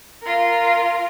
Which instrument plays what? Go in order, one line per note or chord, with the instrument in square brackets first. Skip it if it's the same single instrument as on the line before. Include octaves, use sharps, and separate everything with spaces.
[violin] F4 A#4